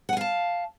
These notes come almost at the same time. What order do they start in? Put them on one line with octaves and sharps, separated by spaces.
F#5 G#5 F5 A5